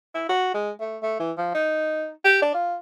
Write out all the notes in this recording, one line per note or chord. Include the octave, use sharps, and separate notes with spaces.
E4
F#4
G#3
A3
A3
E3
F3
D#4
G4
D4
F4